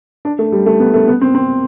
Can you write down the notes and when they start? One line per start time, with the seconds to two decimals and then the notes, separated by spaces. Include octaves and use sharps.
0.25 D4
0.39 A3
0.52 G3
0.66 A3
0.80 B3
0.94 A3
1.08 B3
1.21 C4
1.35 C4